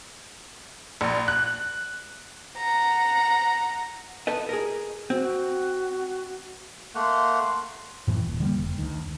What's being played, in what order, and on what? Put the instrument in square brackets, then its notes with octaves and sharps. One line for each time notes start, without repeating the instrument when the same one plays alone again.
[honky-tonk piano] A#1
F#6
[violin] F#5 A#5
[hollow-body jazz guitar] A4 B4 D#5
G#4 A#4
[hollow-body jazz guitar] C4 [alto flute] F#4
[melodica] A3 A#3 F#5 [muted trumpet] C6
[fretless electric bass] F#2 A2 E3
D#1
D3 G3 G#3 A#3
F1
D2 D#3